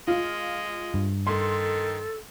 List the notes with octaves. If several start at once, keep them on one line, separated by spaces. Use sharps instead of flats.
G#3 F4
G2
D#3 A4 C6